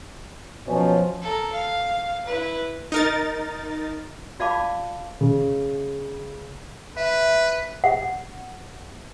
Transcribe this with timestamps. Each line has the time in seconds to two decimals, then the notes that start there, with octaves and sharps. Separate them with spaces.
0.68 B2 F3 F#3 C#4
1.21 A4 A#4
1.52 F5
2.26 E4 B4
2.92 D#4 A#4 A6
4.40 F4 D5 F5 A5 B5 D6
5.21 C#3
6.97 B4 E5
7.84 F#5